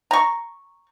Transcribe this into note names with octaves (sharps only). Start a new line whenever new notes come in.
A#5 C#6